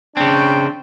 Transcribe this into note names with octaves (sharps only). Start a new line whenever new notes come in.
C#3 C4 D4 G5